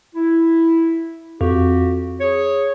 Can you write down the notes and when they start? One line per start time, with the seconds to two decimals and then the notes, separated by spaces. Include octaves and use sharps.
0.15 E4
1.41 F2 F#4 G4
2.20 G#4 C#5